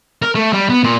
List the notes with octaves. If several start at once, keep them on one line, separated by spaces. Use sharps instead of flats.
A#4
A3
G3
B3
A#2